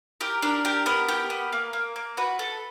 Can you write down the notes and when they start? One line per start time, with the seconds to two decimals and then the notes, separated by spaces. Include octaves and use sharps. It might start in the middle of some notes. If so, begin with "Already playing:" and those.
0.21 G4 A#4
0.42 D4 A#4
0.65 G4 A#4
0.86 B3 A#4
1.08 G4
1.30 B3
1.53 A#3
1.73 A#3
1.96 A#3
2.17 F#4 B4
2.39 A4